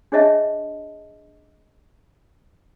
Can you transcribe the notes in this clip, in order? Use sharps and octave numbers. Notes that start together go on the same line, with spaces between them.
D4 G#4 C#5 D#5 E5 A5